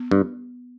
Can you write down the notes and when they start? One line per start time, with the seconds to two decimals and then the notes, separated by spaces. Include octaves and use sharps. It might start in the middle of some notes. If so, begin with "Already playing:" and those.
Already playing: B3
0.11 G2